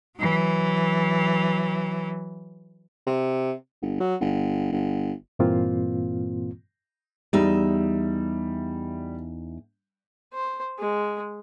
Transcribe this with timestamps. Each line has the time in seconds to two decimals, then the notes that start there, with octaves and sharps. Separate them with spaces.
0.19 E3 F#3
3.07 C3
3.82 G1
4.00 F#3
4.21 G1
4.72 G1
5.39 G2 A#2 E3 A#3 C4 F4
7.33 E2 G3 D#4 E5
10.34 C5
10.79 G#3